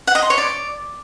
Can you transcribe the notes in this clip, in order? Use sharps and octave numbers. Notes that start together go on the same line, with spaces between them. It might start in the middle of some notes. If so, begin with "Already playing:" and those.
F#5
D#5
C6
C#5
D5